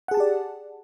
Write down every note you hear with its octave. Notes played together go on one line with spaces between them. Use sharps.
G4 G#4 D5 F#5 A5